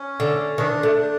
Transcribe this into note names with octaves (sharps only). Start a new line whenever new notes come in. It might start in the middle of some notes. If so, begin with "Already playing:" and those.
Already playing: C#4
D3
D#3 D4
A3
D4